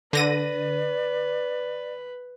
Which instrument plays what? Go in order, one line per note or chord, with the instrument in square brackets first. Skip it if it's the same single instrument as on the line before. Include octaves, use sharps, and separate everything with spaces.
[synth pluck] D3 A#6 D#7 [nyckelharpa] B4 [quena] D5